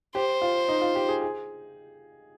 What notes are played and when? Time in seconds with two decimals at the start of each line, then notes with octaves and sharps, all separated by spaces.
0.15 G4 C5
0.42 F4
0.68 D#4
0.82 F4
0.95 G4
1.09 G#4
1.22 G#4